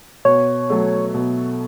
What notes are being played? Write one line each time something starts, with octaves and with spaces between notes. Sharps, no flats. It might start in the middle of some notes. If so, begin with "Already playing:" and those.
B2 C#5
F#3 A3
B2